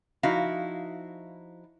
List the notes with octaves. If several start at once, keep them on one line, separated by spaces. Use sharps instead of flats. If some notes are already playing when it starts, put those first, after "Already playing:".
F3 D#4 E4 F#4 F5